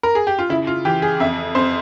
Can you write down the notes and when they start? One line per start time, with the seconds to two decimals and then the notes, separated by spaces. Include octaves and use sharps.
0.03 A#4
0.15 G#4
0.27 G4
0.39 F4
0.49 C#3 E4
0.67 F4
0.85 E3 G4
1.02 G#4
1.20 F2 E5
1.55 F2 C5